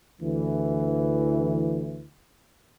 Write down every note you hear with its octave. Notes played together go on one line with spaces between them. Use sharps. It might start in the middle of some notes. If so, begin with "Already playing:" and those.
D2 D3 E3